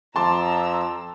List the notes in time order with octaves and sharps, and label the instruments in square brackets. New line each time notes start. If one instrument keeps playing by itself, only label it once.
[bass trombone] F2 [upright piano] A5 C6 D6 [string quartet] A#5 E6